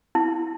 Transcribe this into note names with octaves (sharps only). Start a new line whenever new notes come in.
E4